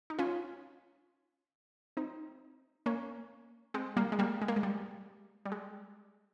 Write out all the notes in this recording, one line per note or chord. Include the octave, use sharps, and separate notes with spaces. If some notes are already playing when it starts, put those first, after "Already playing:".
D#4
C#4 F4
C4 D#4
A#3 C#4
G#3 C4
G3 A#3
G#3
G3 A#3
G#3
A#3
G#3
G3
G3
G#3